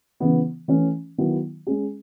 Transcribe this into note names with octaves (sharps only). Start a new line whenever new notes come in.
C#3 E3 B3
E3 A3 C#4
D#3 F#3 B3 E4
G#3 C#4 G#4